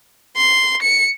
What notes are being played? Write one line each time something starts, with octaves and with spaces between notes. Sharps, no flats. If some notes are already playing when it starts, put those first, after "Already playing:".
C6
C#7